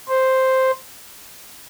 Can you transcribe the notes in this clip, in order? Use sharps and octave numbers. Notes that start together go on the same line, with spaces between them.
C5